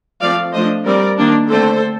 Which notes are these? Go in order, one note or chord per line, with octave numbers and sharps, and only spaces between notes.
F3 A3 C4 D5 F5
F3 A3 D4 C5 D#5
G3 C4 A#4 D5
D#3 A#3 D4
D3 A3 C4 A4 C5